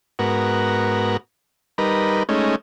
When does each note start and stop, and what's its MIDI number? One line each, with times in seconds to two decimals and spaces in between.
0.19 1.17 44
0.19 1.17 59
0.19 1.17 66
0.19 1.17 70
1.78 2.23 55
1.78 2.23 63
1.78 2.23 70
1.78 2.23 71
2.29 2.56 56
2.29 2.56 57
2.29 2.56 61
2.29 2.56 63